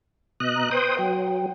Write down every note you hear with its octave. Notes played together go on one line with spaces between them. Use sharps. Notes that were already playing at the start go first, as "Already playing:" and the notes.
B2 D#5 F#6
A#5
B4 C5 G5 D#6
F#3 G5